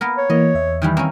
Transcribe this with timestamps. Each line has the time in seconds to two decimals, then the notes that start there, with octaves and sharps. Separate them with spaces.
0.01 A#3 B3 A#4
0.17 C#5
0.30 E3 A#3 D#5
0.55 E2 E5
0.82 D#3 E3 G3
0.97 A#3 C4 C#4